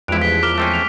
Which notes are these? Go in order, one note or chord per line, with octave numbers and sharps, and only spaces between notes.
E2 G2 F3 G#3 E4 F#6 D7 F7
A1 B6 G7
A#4 D6 F6 G7
A3 C4 C#4
F7